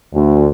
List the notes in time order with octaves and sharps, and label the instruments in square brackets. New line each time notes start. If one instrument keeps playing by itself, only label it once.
[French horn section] D2